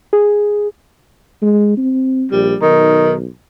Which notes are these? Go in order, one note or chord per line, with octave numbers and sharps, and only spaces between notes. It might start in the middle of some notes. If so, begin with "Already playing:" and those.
G#4
G#3
C4
A#1 G3
B1 D#3